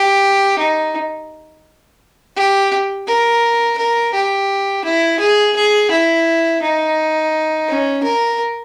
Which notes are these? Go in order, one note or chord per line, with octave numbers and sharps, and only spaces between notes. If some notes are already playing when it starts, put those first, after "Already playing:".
Already playing: G4
D#4
G4
A#4
A#4
G4
E4
G#4
G#4
E4
D#4
C#4
A#4